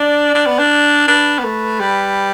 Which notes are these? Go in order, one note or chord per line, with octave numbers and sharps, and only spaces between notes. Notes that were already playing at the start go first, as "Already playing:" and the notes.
Already playing: D4 D5
D4
B3
D4
D4 B4
B3
A3
G3